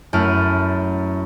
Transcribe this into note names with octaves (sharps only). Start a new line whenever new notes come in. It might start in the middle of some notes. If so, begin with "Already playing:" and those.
F#2 A3 E4 F6 D#7